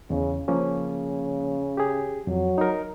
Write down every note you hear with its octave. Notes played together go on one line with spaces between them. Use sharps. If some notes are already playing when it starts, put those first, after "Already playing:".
E2 C#3
C#3 F3 A#3 C#4
G4 G#4
F2 F#3
D#4 A#4